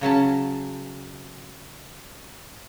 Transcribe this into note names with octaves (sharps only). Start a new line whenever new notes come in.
C#3 F#3 C#4 A5